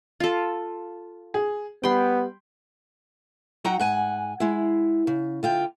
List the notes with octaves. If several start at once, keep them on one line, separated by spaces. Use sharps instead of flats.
F4 A4
G#4
G3 B3 G5 B5 C6
F#3 D#4 F#4 F#5 G5 A#5
G#2 F#5 G#5
G#3 E4
C#3
D3 F4 G5